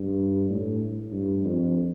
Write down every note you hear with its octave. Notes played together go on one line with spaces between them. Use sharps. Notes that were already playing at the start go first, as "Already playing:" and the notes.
Already playing: G2
A2
G2
F2